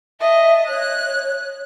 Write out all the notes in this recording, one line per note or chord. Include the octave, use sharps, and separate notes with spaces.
D#5 E5 A5
C#5 F#6